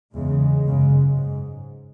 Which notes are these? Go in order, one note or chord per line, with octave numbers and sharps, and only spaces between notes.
E2 C#3 G#3
F#2 C#3
G#2